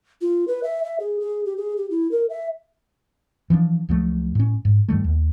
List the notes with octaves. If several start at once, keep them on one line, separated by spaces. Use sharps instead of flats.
F4
B4
E5
E5
G#4
G#4
G4
G#4
G4
E4
A#4
E5
E3 F3 B3 D4
C#2 F3 F#3 A3
A2 C#4
G#2
G2 D#3 G3 A3
D#2